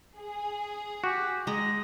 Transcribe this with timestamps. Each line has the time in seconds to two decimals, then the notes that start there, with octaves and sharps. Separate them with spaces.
0.19 G#4
1.04 F#4 G4
1.47 G#3 D#5 A#5